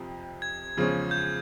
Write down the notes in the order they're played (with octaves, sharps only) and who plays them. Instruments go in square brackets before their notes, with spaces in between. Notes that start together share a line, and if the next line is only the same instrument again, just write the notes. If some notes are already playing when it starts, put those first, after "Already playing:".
Already playing: [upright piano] F2 C3 F3
[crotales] G#6
[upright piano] E2 C#3 F3 G#3 C#4
[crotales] G6